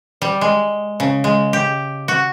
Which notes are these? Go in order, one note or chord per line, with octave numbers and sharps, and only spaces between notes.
G3
G#3
C#3
G#3
G4
F#4